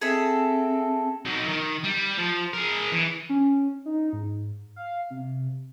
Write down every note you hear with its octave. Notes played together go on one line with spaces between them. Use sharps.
C4 G#4 A4 E5
F#3 D#4
D#3
G3
F3
G#4 A#4
E3
C#4
D#4
G#2
F5
C3